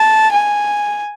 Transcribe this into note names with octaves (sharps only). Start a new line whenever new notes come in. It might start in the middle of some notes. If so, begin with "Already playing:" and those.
Already playing: A5
G#5